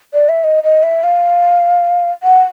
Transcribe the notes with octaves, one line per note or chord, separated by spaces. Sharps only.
D5
E5
D#5
D#5
E5
F5
F#5